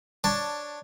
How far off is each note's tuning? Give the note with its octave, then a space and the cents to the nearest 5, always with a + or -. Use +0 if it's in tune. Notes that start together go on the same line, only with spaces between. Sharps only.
D4 +0 C#5 +0 A5 +10